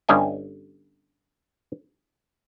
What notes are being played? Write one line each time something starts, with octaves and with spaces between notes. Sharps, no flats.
G1 G2 G3 C#4 D#5 G#5